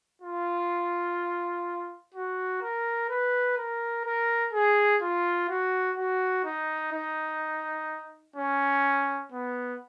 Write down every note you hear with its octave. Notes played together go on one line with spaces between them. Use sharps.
F4
F#4
A#4
B4
A#4
A#4
G#4
F4
F#4
F#4
D#4
D#4
C#4
B3